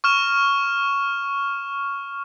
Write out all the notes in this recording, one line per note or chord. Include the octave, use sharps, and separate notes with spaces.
C#6 F6 E7